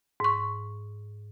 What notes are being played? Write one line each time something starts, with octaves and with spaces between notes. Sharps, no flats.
G#2 C#6